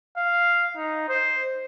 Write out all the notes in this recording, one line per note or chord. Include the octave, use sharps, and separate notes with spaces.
F5
D#4
C5